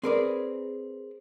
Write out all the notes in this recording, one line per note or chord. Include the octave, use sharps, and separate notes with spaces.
C4 G#4 A#4 B4 D5